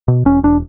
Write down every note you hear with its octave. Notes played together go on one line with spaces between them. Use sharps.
B2
E1 C#4
E1 D4